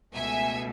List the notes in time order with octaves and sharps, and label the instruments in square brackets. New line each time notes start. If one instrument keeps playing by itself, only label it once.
[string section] C#2 B2 A3 E5 G#5